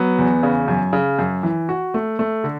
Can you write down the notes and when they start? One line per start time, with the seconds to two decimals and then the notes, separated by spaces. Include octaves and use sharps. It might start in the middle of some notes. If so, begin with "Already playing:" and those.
Already playing: F#3 B3
0.18 E2
0.43 C#3
0.68 F#2
0.93 C#3
1.19 F#2
1.43 E3
1.69 F#4
1.94 A3
2.19 A3
2.44 D3